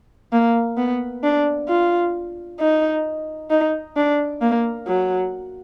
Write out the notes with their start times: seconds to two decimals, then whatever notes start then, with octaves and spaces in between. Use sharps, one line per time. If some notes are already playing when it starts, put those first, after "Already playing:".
0.32 A#3
0.77 B3
1.24 D4
1.69 F4
2.60 D#4
3.50 D#4
3.97 D4
4.41 A#3
4.87 F#3